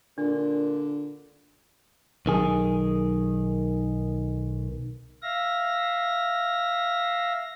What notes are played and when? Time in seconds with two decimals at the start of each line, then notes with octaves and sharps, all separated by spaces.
0.18 A#2 D3 D4
2.26 B1 D#3 G#4
5.22 E5 F5 A#6